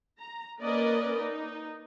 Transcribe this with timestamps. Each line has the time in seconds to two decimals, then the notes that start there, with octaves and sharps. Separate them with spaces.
0.19 A#5
0.59 A#3 C#4 A#4 B4 D5 D#5
1.19 D#4